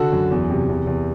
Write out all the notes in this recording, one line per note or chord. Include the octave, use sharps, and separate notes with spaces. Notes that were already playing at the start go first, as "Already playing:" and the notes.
Already playing: D3 F#4 A4
F#2
E2
C3
E2
E2